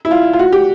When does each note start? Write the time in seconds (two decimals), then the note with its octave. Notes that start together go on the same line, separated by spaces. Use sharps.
0.05 E4
0.11 F4
0.33 F4
0.39 F#4
0.52 G4